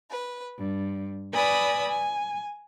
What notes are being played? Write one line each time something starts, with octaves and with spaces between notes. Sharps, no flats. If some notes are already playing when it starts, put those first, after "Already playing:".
B4
G2
B4 D5 G#5 B5 D#6 E6
G#5